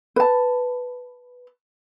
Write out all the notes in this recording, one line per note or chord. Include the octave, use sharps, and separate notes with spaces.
B4 A5